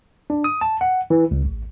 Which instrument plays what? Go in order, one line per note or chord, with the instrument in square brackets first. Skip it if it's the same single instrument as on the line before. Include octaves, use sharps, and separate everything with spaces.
[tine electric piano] D4
D#6
A5
F#5
E3
C#2
A1